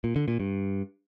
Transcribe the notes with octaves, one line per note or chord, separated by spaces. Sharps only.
A#2
D3
A#2
G2